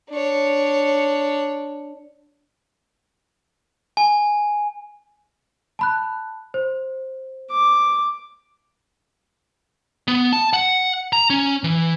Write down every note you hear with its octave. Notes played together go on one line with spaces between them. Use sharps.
D4 C#5
G#5
A5 B5 F#6
C5
D6
B3
A5
F#5
A#5
C#4
E3